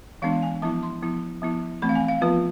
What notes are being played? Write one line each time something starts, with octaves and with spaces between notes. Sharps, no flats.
E3 G#3 B3 D4 F5
G#5
F3 B3 E4 A5
C6
F3 B3 E4
F3 B3 E4
E3 A3 C4 B5
F5
G#5
F5
F3 B3 F4 B4